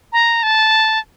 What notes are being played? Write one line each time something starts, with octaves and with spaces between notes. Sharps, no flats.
A#5
A5